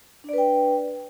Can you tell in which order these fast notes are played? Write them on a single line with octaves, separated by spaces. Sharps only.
D4 D5 B4 G5